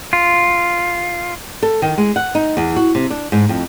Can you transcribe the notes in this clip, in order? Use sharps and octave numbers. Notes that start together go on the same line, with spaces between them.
F4
A4
D#3
G#3
F#5
D#4
E2
F#4
C3
D4
G#2
F2